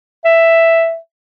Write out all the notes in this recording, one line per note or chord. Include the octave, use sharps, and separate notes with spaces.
E5